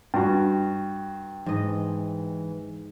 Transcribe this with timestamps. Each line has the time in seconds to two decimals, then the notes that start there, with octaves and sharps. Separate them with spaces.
0.14 G2 F#4 G5
1.46 G#2 E3 D#5